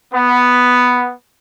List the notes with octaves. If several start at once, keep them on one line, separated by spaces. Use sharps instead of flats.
B3